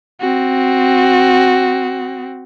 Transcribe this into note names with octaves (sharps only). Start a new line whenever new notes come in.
C4 F#4